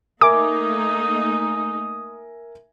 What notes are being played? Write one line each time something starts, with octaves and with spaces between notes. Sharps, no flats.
A3 A#3 D#4 A#4 E5 G#5 D6 D#6